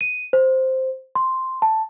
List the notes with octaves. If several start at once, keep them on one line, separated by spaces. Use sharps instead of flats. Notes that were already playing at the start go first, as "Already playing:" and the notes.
D#7
C5
C6
A5